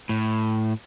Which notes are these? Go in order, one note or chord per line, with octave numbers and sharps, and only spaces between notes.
A2